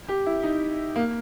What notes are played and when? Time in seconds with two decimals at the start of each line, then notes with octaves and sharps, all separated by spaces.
0.08 G4
0.26 E4
0.43 D#4
0.96 A#3